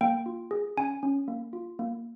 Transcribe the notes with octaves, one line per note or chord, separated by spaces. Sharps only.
A#3 G5
F4
G#4
C#4 G#5
C#4
A#3
F4
A#3